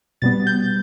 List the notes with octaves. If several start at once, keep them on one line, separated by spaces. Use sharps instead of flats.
B2 G3 B3 A6
G6